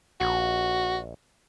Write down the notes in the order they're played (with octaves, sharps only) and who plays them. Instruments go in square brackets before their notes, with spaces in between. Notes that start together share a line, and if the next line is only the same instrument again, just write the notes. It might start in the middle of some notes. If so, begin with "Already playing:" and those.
[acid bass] A#1 [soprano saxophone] F#4